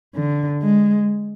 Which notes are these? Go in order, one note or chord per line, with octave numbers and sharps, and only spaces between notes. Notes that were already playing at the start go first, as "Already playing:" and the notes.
D3
G#3